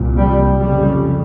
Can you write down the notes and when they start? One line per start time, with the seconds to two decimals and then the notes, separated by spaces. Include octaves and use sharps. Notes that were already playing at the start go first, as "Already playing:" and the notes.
Already playing: C2 A#2
0.17 G3
0.59 F2 C#3 G3